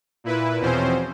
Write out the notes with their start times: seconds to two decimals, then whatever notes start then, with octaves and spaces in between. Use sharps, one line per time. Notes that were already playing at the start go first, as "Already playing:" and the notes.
0.24 A#2 E4 B4
0.60 E2 B2 F3 C4 C#4 C5